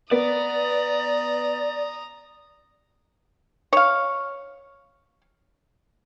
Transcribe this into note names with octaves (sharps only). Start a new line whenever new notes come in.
B3 D5 A#5 D#6
C#5 F5